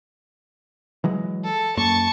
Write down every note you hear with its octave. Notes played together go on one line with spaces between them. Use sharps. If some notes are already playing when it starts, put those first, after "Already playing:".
E3 F#3 G#3
A4
F#2 A#3 A5 C#6